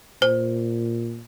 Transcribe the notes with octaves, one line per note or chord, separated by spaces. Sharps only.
A#2 C5